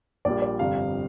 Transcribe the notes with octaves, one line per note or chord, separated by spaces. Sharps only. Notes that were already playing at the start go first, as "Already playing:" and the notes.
A#1 A#2 G3 D5
D5
G1 F2 C3 G3 F5